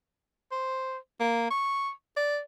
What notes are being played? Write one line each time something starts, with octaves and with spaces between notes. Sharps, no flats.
C5
A#3
C#6
D5